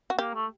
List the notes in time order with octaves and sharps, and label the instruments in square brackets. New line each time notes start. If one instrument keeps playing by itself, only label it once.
[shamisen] F#4
[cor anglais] A#3 [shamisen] G4
[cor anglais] A3